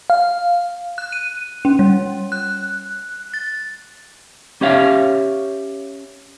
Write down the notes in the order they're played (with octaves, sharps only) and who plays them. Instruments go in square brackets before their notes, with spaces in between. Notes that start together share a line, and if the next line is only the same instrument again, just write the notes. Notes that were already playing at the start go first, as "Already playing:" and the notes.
[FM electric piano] F5
[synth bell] F#6
D#7
C#4
G3
F#6
A6
[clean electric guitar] C#4 G4 C#5 E5 F5